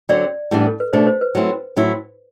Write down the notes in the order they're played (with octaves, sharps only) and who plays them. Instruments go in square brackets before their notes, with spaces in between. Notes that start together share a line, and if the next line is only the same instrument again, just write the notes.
[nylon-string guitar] D3 F#3 C4 [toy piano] D5
[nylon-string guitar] A2 E3 G3 B3 D4
[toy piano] A4
B4
[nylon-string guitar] B2 A3 D4 [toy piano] C5
[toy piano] C5
B4
[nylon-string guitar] F#3 A3 C4 E4
A2 F#3 C4 E4